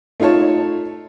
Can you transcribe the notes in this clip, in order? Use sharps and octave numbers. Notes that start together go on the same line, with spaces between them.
A3 D#4 F4 C#5 A5